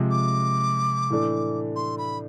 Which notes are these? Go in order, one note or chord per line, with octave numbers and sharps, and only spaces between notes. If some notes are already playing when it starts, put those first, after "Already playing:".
Already playing: C3 F3 G#3
D6
A2 E3 A3 D4
C6
B5